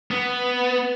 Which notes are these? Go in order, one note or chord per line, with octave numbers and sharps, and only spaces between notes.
B3